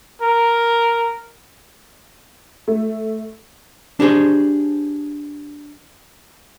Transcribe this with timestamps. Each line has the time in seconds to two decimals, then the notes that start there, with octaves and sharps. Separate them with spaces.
0.22 A#4
2.68 A3
4.00 D4 G4 G#4 C5